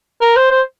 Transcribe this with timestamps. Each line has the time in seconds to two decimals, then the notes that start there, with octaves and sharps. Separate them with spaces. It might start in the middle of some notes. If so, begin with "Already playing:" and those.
0.21 A#4
0.36 C5
0.51 C5